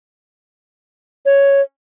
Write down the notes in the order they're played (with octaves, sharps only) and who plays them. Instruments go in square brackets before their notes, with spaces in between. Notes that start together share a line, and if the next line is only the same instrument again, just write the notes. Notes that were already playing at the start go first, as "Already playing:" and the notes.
[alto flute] C#5